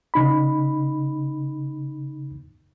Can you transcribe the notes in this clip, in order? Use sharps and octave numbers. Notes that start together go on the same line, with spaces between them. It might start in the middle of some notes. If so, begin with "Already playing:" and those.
C#3 D#4 B5